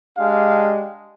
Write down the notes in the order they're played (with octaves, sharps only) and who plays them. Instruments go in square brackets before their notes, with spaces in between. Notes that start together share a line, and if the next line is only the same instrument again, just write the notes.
[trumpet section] G#3 D4 G4 F5